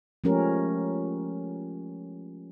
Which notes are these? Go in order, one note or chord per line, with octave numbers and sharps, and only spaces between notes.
F3 G#3 A3 C#4 G4 A#4